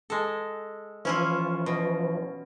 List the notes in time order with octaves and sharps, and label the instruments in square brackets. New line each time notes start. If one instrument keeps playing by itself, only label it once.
[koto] G#3 A4
[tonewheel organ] E3 F3 [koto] C#4 E4 F4
[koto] B2